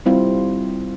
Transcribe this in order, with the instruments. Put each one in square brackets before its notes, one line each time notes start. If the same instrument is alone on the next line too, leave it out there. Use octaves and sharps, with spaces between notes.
[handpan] G3 C4 E4 F4